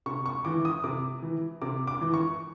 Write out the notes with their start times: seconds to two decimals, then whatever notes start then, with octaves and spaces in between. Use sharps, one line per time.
0.06 C3 C#6
0.26 C#6
0.45 E3 D6
0.65 D#6
0.84 C3 D6
1.22 E3
1.62 C3 D6
1.87 D6
2.01 E3
2.14 C#6